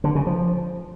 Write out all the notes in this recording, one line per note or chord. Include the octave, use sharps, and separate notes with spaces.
D3
C#3
F3